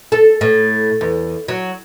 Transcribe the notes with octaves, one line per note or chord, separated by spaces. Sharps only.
A4
A2
E2
F#3